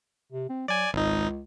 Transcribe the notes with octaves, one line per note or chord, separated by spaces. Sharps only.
C3
C4
F#3 D5 G#5
G#1 C#2 D#4